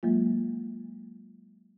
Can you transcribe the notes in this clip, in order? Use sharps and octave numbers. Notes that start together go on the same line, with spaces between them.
F#3 G#3 A#3 F4